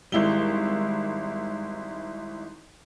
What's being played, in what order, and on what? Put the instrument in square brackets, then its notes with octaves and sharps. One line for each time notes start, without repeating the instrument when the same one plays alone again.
[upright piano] G#1 E4 G7 [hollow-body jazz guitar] G3 G#3